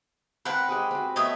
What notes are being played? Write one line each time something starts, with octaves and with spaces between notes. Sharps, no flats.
C4 A#4 B4 F#5
G#3 G4 G#4
C4 F#4
A3 B3 C#5 D#5 E5